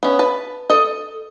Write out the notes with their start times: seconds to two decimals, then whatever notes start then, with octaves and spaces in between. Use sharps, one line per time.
0.03 B3 C#4
0.19 B4 A5
0.70 A4 D#5